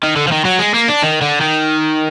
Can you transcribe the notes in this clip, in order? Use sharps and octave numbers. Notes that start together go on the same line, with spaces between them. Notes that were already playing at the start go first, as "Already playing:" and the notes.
D#3
D3
F3
D#3
F#3
G#3
A#3
D4
D#3
D3
D#3